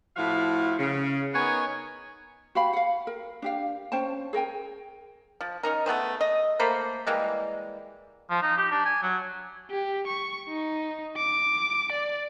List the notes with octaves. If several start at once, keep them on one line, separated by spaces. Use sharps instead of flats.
A2 F3 E4 F#4 F5
C#3
B3 D#4 A#4 C#5 F#5 G#5
F#4 G4 F5 B5
F5 F#5
A#4
D4 G4 F5
C#4 C5 G5 A5
G#4 A#4 G5 G#5
F3
C#4 D#4 A#4
A3 B3 G#4 C5
D#5
A3 A#3 C5 B5
E3 G3 G#3 A#3
F3
D#4
G4
D4
G#5
F#3
G4
C#6
D#4
D6
D5